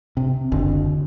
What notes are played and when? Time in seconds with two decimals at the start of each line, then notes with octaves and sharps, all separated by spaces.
0.17 C3
0.52 F#1 D#2 D3